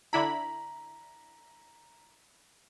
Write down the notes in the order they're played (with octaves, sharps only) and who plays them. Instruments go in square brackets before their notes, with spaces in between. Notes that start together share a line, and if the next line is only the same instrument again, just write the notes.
[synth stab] D3 E4 B5 [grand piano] A#5